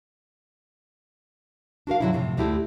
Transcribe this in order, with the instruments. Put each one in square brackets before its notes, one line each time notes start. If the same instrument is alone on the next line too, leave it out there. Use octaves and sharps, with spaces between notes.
[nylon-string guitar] D4 F#4 A#4 F5
G2 D3 D#3 F#3 G3 E4
A2 C3 F3
D2 A3 E4 G4